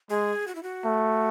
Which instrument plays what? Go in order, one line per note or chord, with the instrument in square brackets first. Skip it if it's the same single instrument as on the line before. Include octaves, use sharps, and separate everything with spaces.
[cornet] G#3 [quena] G#4
[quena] F#4
E4
F#4
[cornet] A3